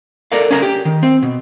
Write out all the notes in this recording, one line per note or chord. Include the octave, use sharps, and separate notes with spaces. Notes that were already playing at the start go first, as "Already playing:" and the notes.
A4 A#4 D5 F5
C#4 G#4 A#4 A5
G4
D#3
C4
B2